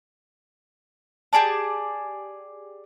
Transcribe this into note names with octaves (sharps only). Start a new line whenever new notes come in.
G4 G#4 D5 A5